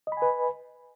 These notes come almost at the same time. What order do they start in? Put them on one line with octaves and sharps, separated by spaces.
D#5 B5 G#5 B4